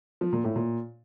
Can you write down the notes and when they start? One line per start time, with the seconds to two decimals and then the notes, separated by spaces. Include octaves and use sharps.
0.21 F3
0.33 A#2
0.44 A2
0.56 A#2